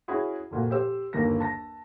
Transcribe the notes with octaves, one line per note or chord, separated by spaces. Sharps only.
C#4 E4 F#4 G#4
F1 A#2 F#4
G4 C5 E6
G1 D#2 A#3 A#6
A5 A#6